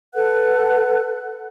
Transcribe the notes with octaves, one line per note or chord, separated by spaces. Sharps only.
A4 B4 F#5 F#6